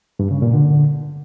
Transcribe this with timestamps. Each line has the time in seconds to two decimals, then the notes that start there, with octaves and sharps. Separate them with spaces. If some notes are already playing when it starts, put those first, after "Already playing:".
0.19 G2
0.31 C#3
0.42 A#2
0.53 D3